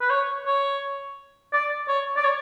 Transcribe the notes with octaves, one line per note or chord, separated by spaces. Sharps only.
B4
C#5
C#5
D5
C#5
D5
C#5